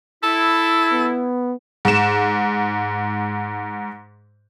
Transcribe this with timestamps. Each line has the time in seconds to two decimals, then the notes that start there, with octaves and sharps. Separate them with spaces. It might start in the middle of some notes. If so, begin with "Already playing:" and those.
0.23 E4 A4
0.92 B3
1.85 G#2 E7